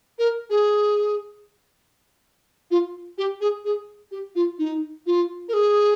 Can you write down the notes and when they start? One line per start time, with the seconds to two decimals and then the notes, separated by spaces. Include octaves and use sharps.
0.18 A#4
0.49 G#4
2.70 F4
3.17 G4
3.40 G#4
3.64 G#4
4.11 G4
4.35 F4
4.58 D#4
5.06 F4
5.48 A#4
5.53 G#4